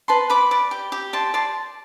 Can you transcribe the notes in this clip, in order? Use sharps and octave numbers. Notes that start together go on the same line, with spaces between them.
B4 A5 C6
B4 B5 D6
D5
G4
G4
D5 A5 C6
D5 A5 C6